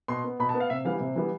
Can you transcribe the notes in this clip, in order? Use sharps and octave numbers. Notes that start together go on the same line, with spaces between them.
B2 C6
B3
B2 B5
A5
B3
F5
C3 E5
E3 G3 B3 F5
C3
E3 G3 B3